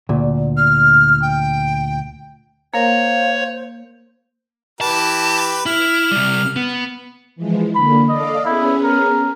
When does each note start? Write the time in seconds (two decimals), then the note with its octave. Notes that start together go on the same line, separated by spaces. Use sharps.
0.09 D2 A#2
0.57 F6
1.22 G5
2.74 A#3 A#4 C5 C#5 F5
4.81 E3 G4 B4 A5
5.66 E4 F6
6.11 C3 G3
6.56 B3
7.36 E3 F3 G#3
7.75 D3 A#3 B5
8.09 A4 D5 D#5 F5
8.45 B3 C#4 E4 G#4
8.84 A#4